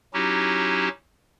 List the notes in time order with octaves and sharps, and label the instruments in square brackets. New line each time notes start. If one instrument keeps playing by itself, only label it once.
[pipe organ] F#3 C#4 D#4 E4 F#4 G4